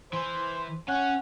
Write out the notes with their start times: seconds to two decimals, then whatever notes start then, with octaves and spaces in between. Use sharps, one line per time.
0.13 E3 C5
0.89 C#4 F#5